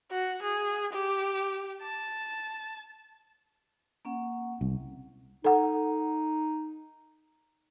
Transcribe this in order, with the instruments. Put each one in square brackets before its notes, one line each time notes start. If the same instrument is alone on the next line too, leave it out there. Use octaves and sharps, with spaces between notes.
[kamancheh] F#4
G#4
G4
A5
[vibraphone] A#3 C#4 F#5
[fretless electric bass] C2
[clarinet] D#4 [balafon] A4 F#5